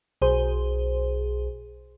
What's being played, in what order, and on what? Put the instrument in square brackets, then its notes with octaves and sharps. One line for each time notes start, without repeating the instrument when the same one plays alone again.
[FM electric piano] B1 G#4 C5